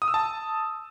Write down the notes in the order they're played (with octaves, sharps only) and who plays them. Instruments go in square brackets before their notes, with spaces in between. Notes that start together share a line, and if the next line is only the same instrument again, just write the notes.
[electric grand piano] D#6
E6
A5